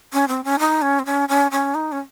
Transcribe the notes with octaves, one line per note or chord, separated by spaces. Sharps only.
C#4
C4
C#4
D#4
C#4
C4
C#4
C#4
C#4
D#4
C#4